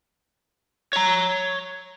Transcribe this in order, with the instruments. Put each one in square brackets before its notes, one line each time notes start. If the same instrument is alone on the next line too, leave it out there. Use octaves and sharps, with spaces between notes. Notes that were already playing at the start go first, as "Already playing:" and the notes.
[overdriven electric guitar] C#5 A#5